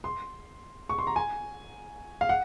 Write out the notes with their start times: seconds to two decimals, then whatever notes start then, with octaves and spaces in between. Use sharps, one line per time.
0.04 C6
0.89 C#6
0.98 C6
1.07 A#5
1.16 G#5
2.21 F5
2.29 F#5